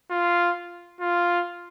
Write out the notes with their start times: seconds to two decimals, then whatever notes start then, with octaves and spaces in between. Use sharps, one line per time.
0.11 F4
1.00 F4